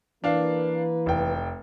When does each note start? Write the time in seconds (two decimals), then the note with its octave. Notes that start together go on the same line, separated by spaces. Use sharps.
0.24 E3 A#3 D4 B4 F5
1.06 F1 G5